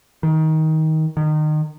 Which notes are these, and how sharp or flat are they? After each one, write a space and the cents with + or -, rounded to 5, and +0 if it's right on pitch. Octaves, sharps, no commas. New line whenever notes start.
D#3 +20
D#3 -25